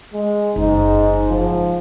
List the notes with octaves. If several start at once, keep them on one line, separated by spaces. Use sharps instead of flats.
G#3
F#1 G#2 D#4
F3